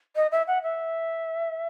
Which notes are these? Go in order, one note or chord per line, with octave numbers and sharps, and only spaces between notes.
D#5
E5
F#5
E5